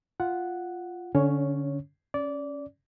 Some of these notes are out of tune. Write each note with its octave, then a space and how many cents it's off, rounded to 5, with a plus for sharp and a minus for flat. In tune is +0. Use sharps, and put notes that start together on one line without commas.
F4 +0 F#5 +0
D3 -20 C#4 +10 C#5 +0
C#4 +0 D5 -20